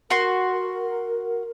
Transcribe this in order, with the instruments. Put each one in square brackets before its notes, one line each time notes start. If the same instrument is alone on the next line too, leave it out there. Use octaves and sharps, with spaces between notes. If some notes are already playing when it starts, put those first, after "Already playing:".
[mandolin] F#4 C6 [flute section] A#4